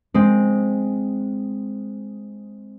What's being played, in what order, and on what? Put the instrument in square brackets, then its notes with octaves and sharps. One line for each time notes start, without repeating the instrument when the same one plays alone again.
[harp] G#3 C4